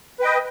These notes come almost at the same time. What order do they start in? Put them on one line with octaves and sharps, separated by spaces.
B4 G5 D#5